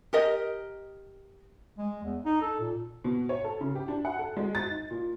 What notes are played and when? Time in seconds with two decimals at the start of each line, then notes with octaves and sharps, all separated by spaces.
0.13 G4 A#4 D#5
1.78 G#3
2.04 E2
2.25 D#4
2.42 A4
2.60 A#2
3.04 B2
3.29 C#5
3.44 A4
3.61 C#3
3.75 G4
3.88 D4
4.05 F#5
4.19 A4
4.37 G#3
4.55 A6
4.69 D#4
4.91 A#2